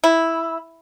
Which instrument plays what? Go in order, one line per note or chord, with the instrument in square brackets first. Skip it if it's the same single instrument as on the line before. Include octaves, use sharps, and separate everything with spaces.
[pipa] E4